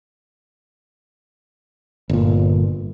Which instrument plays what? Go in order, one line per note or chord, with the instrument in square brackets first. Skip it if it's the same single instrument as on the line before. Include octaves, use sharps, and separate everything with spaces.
[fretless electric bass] G1 A#2